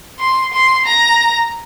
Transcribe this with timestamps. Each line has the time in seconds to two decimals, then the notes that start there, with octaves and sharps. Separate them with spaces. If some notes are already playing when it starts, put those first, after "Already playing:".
0.19 C6
0.53 C6
0.86 A#5